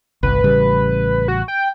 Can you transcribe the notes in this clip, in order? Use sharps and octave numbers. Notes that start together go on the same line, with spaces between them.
G1 C2 B4
A1 C#3 G3
F#4
G5